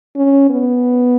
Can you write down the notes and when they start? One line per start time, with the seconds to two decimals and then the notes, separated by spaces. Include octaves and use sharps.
0.16 C#4
0.50 B3